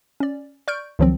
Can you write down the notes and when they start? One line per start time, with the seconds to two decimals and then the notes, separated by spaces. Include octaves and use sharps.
0.20 C#4 D5
0.68 D5 C#6 F6 G6 D7
0.99 C#2 D#3 F3 F#3 C4